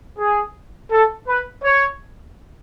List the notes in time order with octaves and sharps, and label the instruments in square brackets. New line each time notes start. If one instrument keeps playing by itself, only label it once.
[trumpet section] G#4
A4
B4
C#5